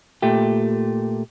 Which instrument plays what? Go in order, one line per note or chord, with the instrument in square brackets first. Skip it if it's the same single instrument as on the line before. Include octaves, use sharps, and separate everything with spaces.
[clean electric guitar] A#2 A3 G4